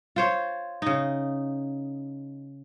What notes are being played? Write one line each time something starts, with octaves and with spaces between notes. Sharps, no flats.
F4 C5 C#5
C#3 D#4